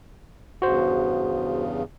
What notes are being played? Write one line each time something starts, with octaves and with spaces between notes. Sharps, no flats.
E2 G2 C#3 F#4 C5